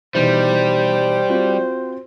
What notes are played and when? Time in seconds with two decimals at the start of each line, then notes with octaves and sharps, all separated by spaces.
0.15 B2 D#3 E3 G3 C5
1.29 C4 F4 F#4